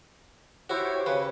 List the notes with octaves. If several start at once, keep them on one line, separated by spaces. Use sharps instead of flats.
E4 F#4 G4 C5 C#5
C#3 B4